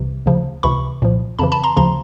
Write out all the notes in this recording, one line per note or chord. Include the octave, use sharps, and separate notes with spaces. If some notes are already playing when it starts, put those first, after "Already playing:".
Already playing: C2 C3 E3
D2 C#3 F3
C#2 C3 E3 B5 C#6
C2 A#2 F3
F2 C#3 E3 A5 B5
A5 B5
A#5 C6
D2 C#3 F3 A#5 C6